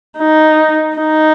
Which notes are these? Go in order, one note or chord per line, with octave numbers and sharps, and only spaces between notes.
D#4
D#4